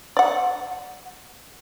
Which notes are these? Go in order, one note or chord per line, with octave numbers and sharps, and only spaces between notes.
D5 F#5